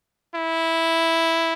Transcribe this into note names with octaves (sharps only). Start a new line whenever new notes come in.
E4